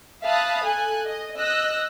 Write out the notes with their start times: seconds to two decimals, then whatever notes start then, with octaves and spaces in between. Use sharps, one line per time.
0.23 E5 F5 A5 B5 D#6 F#6
0.64 A4 G#5 F#6
1.05 D#5
1.38 D#5 E6 F#6 A#6